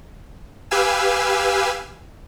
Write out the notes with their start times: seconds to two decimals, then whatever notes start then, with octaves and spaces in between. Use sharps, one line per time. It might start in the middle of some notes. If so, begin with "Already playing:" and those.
0.71 G4 B4 F5 G#5 E6